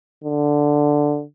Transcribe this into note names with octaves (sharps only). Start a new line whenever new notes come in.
D3